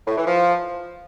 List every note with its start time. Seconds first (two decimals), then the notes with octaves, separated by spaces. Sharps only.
0.07 A2
0.17 E3
0.27 F3